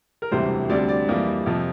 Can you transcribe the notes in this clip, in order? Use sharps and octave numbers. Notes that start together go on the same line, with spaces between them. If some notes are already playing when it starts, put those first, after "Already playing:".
A#4
E1 D2 C3 E3 G3 C5
D2 D3 G3 C4 D5
D5
F2 E3 G3 A#3
F2 C3 F3